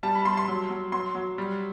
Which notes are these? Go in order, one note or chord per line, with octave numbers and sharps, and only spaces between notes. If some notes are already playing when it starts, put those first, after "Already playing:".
G3 A5
B5
G3 C6
C6
F#3
F#3
F#3 C6
F#3
G3